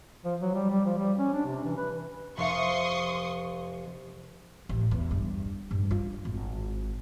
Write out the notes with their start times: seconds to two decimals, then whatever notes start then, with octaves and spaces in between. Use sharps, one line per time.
0.25 F3
0.41 F#3
0.54 G3
0.71 G3
0.85 F3
0.98 G3
1.17 C#4
1.33 D4
1.46 C3
1.64 E3
1.77 B4
2.37 F1 F5 C6 C#6 D#6
4.69 A1
4.91 E2
5.11 G2
5.71 G2
5.91 F4
6.25 G#1